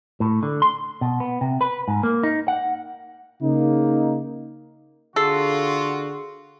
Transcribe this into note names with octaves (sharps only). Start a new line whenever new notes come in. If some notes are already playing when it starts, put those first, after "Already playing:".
A2
D3
C6
B2
B3
C3
B4
G#2
A#3
D#4
F#5
C#3 A#3 D#4
D3 F4 F#4 G#4 A4 E6 C7